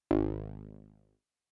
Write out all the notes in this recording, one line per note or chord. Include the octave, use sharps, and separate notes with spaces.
G#1